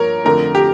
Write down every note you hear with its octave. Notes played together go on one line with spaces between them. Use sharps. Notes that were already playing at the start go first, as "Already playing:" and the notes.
Already playing: G2 F3 A#3 A#4 C#5
F2 D3 A3 A#4
G4